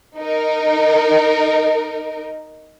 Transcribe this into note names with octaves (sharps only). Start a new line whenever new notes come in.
D#4 A#4